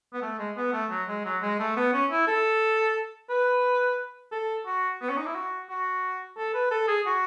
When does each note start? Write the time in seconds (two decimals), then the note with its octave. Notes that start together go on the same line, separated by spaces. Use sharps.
0.13 B3
0.22 A3
0.39 G#3
0.57 B3
0.73 A3
0.91 F#3
1.08 G#3
1.25 F#3
1.42 G#3
1.60 A3
1.76 B3
1.93 C#4
2.11 E4
2.28 A4
3.30 B4
4.32 A4
4.66 F#4
5.01 B3
5.09 C#4
5.17 D#4
5.26 E4
5.35 F#4
5.70 F#4
6.38 A4
6.54 B4
6.71 A4
6.88 G#4
7.06 F#4